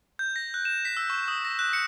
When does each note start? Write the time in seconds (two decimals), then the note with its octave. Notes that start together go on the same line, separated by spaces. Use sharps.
0.19 G6
0.36 A#6
0.54 F#6
0.65 E7
0.85 B6
0.97 E6
1.10 C#6
1.28 D#6
1.45 A#6
1.59 F#6
1.73 C#7